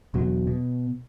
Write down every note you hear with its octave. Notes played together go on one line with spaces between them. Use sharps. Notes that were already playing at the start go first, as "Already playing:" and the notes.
E1 B2 F#3
B2